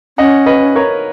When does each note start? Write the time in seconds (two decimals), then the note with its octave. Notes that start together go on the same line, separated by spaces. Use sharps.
0.18 C#4 D#5 F#5
0.46 B4 D#5
0.75 A#4 C#5